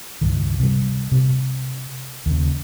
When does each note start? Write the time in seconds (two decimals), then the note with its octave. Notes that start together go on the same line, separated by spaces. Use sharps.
0.21 C#2 G2 D#3
0.60 C3 G3
1.12 C3
2.26 D#2 C#3